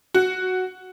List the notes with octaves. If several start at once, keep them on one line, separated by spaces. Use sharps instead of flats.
F#4